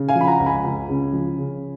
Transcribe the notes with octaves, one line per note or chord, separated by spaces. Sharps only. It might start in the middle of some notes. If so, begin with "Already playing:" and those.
Already playing: C#3
F5 G#5
F3
B5
F#5 A#5
C#2
G#5 B5
C#2
C#3
F3
C#3